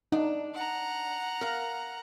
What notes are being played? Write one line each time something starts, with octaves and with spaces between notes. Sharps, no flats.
D4 D#4
F#5 A#5
A#4 F5